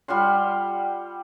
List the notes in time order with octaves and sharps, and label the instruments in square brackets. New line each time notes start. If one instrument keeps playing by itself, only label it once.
[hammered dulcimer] G3 F4 F#5 C6